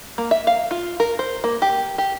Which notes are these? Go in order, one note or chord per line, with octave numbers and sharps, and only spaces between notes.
A#3
E5
F5
F4
A#4
C5
A#3
G4
G4